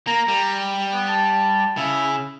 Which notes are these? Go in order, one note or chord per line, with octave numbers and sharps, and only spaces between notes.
A#3 A#5
G3
B3
A5
C#3 E4